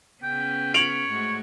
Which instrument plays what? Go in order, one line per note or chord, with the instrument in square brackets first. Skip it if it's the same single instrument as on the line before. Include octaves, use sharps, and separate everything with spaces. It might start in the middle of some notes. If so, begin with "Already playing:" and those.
[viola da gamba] C#3 B3 C#4 [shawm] G5
[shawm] C#5 [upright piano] D7 F7 F#7
[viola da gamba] G#2 A3 F#4